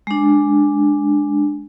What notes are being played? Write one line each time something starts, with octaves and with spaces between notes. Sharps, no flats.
G#3 D4